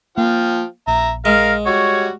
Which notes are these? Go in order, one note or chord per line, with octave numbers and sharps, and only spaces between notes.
F3 A#3 F5 G5
A#1 E5 A#5
G#3 A#4 F5
G3 F#4 C#5